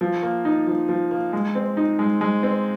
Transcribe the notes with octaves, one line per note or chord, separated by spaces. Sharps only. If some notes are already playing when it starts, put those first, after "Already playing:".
F3
A#3
D#4
F3
F3
A#3
G#3
C4
D#4
G#3
G#3
C4